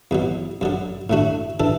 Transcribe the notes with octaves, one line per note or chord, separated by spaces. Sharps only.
E2 B2 F#3
F#2 D3 F#3
A2 A3 D4 F#4
E3 D4 A4